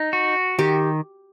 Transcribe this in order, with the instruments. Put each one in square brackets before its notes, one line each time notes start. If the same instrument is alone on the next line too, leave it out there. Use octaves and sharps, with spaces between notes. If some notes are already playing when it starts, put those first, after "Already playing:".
Already playing: [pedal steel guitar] D#4
F#4
[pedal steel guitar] D#3 [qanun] G4